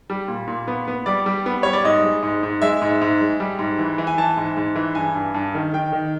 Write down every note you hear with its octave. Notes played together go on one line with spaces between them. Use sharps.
G3
A#2
A#2
B3
B3
G3 D5
G3
B3
G3 C#5
D5
G#2 D#5
G#3
G#2
G#2
G#3 E5
G#2
G#2
G#3
G3
G#2
E3
E3
G#5
E3 A5
G#2
G#2
E3
G2 G#5
G2
G2
D#3
D#3 G5
D#3